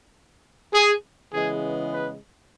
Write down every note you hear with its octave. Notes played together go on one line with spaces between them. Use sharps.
G#4
C#3 E3 G#3 B3 G#4
B4